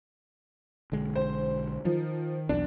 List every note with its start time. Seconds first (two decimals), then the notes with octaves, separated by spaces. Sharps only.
0.92 B1 D3 G#3
1.16 C5
1.85 D#3 F3
2.49 B1 E2 D4